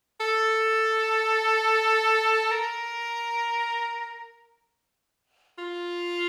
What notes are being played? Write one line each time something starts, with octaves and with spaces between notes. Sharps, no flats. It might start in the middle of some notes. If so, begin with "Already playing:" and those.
A4
A#4
F4